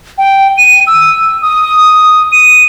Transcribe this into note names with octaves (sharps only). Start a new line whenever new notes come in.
G5
D#7
E6
D#6
D#7